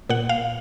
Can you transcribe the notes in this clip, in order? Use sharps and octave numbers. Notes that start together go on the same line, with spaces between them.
A#2 F#5
F5